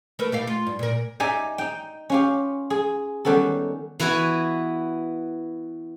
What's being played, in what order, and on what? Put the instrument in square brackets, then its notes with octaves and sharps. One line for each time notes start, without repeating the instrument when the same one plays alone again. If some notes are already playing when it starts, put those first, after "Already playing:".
[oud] A3 A#4 B4
A3 G4 F5
F4
G2
A#2 A#4
[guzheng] D#4 G4 D5 E5 G#5
D#4 G5
C#4 F4 G4
G#4
D#3 G3 B3 C#4 A4
E3 B3 F#4 B4 G#5